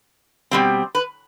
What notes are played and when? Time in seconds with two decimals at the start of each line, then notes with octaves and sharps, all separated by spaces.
0.51 B2 G3 C4
0.95 B4